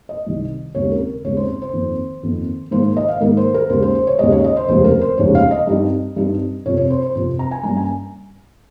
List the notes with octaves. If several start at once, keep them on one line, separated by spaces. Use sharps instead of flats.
D#5
C2 C3 D#3 G3
D#2 C#3 G#3 C4 C#5
A#4
D#2 C#3 G#3 C4 C#5
C5
C5
C5
F2 D#3 A#3
F2 D#3 A#3
G#2 D#3 A#3 C5
C5
D#5
F5
G#2 D#3 A#3 A#4
C5
A#4
D#2 C#3 G#3 C5
C5
C5
C#5
D#2 C#3 G#3 D#5
C#5
D#5
C5
F1 D#2 C#3 G#3 C5
A#4
C5
F1 D#2 C#3 G#3 C#5
F5
D#5
G2 G3 C4 D#4
G2 G3 C4 D#4
F2 C3 F3 C#5
C#5
C5
C5
F2 C3 F3 C5
A#5
G#5
G2 G3 A#3 C#4 A#5
G#5